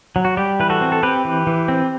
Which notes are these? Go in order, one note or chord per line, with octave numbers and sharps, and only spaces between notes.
F#3
F#4
G3 G4
E3 B4
F#4 A4
C4
A4
C4 G4 B4
E3
E3
C4